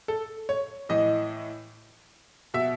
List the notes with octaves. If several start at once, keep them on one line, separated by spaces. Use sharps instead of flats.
A4
C#5
A2 E3 D#5
B2 E5